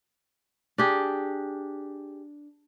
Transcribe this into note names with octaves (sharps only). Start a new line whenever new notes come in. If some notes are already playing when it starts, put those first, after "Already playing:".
D4 G4 G#4